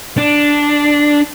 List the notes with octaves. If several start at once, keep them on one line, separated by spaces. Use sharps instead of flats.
D4